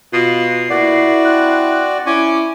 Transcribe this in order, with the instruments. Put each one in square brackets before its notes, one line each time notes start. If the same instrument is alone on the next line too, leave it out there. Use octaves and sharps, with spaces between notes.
[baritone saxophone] B2 [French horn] F4 [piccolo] C7
[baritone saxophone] A#2 [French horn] E4 [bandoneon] F#4 D5
[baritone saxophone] C4 [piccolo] F#6
[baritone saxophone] C#4 [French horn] E4 [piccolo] D6